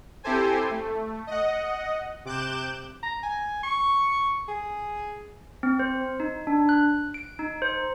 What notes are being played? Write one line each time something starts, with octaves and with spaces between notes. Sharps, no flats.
C4 E4 G4 A4 C5 G#5
A3
D#5 F#5
C3 D6 F#6 G6 E7
A#5
G#5
C#6
G#4
C4
C5
D#4
D4
F#6
D7
D#4
C5